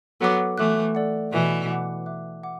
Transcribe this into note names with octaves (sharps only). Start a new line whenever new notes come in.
F#3 B3 A4 F#5 D6
E3 A3 A4 E5 D6 F#6
A4 D5 F#5
B2 E3 B4 D5 F#5
F#5 D6 F#6
E5 D6 F#6
F#5 D6